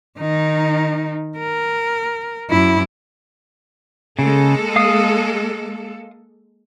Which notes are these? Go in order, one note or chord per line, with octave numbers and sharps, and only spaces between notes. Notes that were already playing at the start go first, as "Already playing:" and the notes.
D#3 D#4
A#4
F#2 E4
C#3 G#3 A#3 A4
F5 D#6